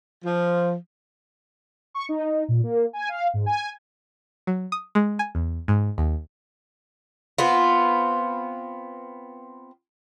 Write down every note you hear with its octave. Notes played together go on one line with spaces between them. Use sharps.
F3
C#6
D#4
A#2
A#3
G#5
F5
G#2
G#5
F#3
D#6
G#3
G#5
E2
G#2
D#2
B3 C4 F4